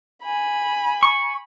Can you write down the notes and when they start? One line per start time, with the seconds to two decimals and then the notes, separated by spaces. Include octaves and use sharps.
0.23 G#5 B5
1.03 C#6